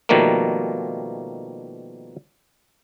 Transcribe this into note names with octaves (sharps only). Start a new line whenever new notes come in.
B2 D#3 F3 G3 A3 A#3